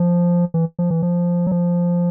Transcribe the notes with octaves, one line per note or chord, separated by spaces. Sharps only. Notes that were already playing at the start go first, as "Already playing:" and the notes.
Already playing: F3
E3
F3
E3
F3
F#3
F3